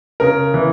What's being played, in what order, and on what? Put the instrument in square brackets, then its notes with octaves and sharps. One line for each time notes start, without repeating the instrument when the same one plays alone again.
[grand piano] C#3 [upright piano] A#4
[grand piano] E3